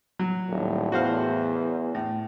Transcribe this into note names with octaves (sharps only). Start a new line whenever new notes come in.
F#3
D#1 A2
E2 F#4 C5 F5
A2